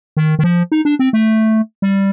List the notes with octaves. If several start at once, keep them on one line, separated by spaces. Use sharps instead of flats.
D#3
D#3
F3
D#4
D4
C4
A3
G3